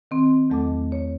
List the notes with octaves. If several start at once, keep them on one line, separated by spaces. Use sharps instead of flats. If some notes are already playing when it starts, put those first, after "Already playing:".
D#3 C4
E2 F#3 A3 A4 D#5 D6
C#5